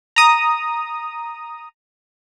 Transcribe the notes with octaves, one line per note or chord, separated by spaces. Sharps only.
A#5 D#6